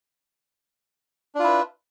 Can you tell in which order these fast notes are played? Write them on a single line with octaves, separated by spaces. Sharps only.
D4 F4 E4 B4